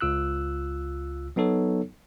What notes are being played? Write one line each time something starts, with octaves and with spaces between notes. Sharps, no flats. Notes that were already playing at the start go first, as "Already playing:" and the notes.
C#2 F4 E6 F#6
F#3 B3 D#4 A4 C#5